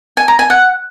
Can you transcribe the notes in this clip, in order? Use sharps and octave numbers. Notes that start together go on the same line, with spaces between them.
G#5
A#5
G#5
F#5